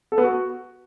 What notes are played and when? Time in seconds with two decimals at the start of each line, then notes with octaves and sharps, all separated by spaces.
0.12 A4
0.18 B3
0.24 F#4